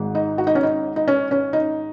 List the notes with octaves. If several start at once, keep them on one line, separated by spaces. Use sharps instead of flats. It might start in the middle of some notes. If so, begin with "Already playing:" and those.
Already playing: G#1 G#2 G#3
D#4
F#4
D#4
C#4
D#4
D#4
C#4
C#4
D#4